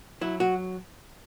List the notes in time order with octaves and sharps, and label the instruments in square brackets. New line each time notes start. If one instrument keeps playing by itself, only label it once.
[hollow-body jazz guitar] F#3 E4
F#3 F#4